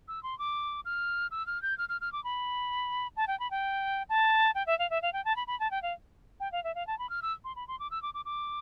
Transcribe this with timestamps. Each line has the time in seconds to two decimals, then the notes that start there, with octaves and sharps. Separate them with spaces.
0.08 E6
0.23 C6
0.39 D6
0.85 F6
1.31 E6
1.47 F6
1.62 G6
1.78 F6
1.89 F6
2.01 F6
2.13 D6
2.24 B5
3.17 A5
3.28 G5
3.40 B5
3.51 G5
4.09 A5
4.55 G5
4.67 E5
4.79 F5
4.90 E5
5.02 F5
5.13 G5
5.25 A5
5.36 B5
5.47 B5
5.60 A5
5.71 G5
5.83 F5
6.40 G5
6.52 F5
6.64 E5
6.75 F5
6.87 A5
6.99 B5
7.10 F6
7.22 E6
7.45 C6
7.56 B5
7.68 C6
7.80 D6
7.91 E6
8.03 D6
8.14 D6
8.25 D6